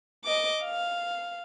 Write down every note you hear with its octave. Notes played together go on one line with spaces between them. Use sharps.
D#5 D6
F5